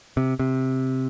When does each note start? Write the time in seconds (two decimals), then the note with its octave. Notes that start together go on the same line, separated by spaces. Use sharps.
0.17 C3
0.39 C3